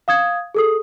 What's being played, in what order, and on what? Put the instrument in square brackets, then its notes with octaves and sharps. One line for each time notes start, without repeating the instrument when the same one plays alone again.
[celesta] F5 D#6 G#6
G#4 A4 D#6